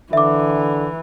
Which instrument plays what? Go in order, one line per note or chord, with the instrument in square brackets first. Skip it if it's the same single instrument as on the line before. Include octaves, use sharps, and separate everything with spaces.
[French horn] D3 [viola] E3 [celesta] E5 D6